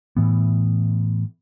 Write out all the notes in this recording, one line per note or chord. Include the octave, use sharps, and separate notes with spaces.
A2 E3 B3